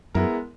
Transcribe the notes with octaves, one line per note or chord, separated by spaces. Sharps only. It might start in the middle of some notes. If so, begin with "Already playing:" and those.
F#2 G#3 B3 E4 A#4